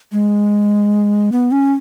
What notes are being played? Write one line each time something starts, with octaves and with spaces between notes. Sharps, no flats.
G#3
B3
C#4